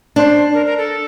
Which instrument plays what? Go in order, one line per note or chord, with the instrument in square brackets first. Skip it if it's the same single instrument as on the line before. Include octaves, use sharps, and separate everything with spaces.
[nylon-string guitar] D4 [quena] C5
[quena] A#4
A#4
A4